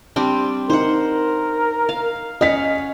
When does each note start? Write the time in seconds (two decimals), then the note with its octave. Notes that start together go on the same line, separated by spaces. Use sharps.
0.16 G3 C4 D4
0.70 D#4 A#4 C5 F#5
1.89 F5
2.41 C#4 D#5 F5 F#5 B6